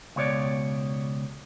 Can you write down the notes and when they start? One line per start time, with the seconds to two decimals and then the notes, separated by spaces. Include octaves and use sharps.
0.16 C#2 B2 C#5 D5